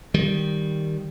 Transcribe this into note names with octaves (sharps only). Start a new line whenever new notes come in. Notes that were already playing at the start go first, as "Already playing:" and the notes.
D#3 G3